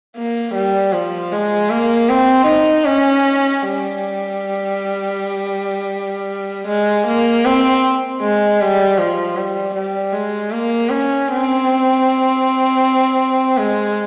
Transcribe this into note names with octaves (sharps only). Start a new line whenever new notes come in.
A#3
G3
F3
G#3
A#3
C4
D#4
C#4
G3
G#3
A#3
C4
G#3
G3
F3
G3
G3
G#3
A#3
C#4
C4
G#3